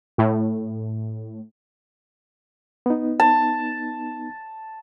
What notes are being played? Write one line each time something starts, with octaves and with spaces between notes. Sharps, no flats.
A2
B3 D#4
A5